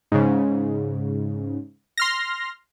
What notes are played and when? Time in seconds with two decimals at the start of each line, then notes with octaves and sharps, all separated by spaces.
0.12 G#2 C#3
1.97 C6 F6 A#6